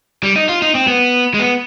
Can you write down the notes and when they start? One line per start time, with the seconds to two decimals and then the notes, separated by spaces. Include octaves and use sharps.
0.23 G3
0.36 D#4
0.49 F4
0.62 D#4
0.75 C4
0.87 B3
1.34 G#3
1.39 B3